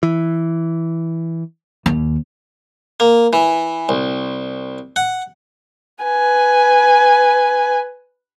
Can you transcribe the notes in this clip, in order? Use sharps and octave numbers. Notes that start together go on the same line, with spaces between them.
E3
D#2
A#3
E3
C2
F#5
B4 G#5